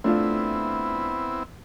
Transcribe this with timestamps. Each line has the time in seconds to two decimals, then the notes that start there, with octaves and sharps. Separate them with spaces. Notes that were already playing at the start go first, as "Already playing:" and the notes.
0.04 A3 B3 C4 D4 E4 F4